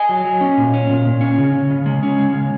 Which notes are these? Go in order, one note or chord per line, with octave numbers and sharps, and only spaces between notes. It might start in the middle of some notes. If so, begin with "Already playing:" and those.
Already playing: D#5 G#5
F#3
F#3
C#4
A#2
C#4
A#2
A#2
C#4
C#3
C#4
C#3
G#3
C#4
G#3
C#3